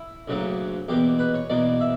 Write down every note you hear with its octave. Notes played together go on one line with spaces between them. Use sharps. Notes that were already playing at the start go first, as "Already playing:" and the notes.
Already playing: E4
D2 C#3 F#3 A#3
E2 B2 A#3 G4
B4
C#5
E2 B2 A#3 D5
E5